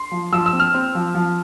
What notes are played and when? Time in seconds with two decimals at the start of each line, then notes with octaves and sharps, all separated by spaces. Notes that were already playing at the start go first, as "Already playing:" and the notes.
Already playing: C6
0.12 F3
0.33 F3 E6
0.46 E6
0.53 C4
0.60 F6
0.74 C4
0.95 F3
1.15 F3